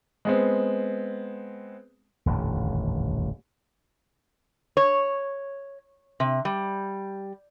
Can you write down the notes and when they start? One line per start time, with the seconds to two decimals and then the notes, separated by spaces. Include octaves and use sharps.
0.25 G#3 B3 C4
2.26 D#1 A1 F2 D3
4.77 C#5
6.20 C3
6.45 G3